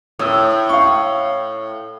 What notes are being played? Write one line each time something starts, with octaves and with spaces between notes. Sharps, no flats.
A2 D#6 E6
F5 C#6